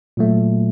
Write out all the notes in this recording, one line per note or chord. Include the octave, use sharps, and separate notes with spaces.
A#2 F#3 A3